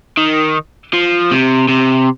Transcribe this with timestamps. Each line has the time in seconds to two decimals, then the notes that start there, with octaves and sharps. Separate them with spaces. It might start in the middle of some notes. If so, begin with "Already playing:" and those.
0.18 D#3
0.93 F3
1.31 C3
1.69 C3